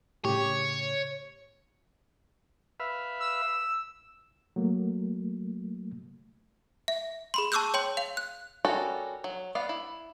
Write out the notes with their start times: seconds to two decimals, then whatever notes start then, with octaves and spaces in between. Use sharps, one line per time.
0.25 A2 C#3 G4 C#5
2.80 B4 E5 F5
3.20 E6
4.56 F#3 A3 A#3
6.88 E5
7.34 G#4 B5 C6
7.52 A5 C#6 D6 E6 F#6 G6
7.74 C#5 G5 C6 G6
7.97 F5 F7
8.17 F#6
8.65 G3 C#4 F#4 A4 A#4
9.24 F#3
9.55 B3 D5 F5
9.69 E4